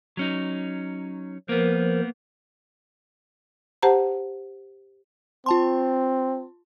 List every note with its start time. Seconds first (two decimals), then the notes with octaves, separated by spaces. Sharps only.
0.17 F#3 C#4 D#4
1.49 F3 A#3 B3 A#4 C5
3.82 G4 C5 F#5 A5 A#5
5.46 C4 F4 A5 C6